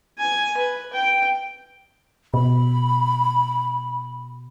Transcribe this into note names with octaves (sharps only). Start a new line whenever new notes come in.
G#5
B4
G5
B2 B5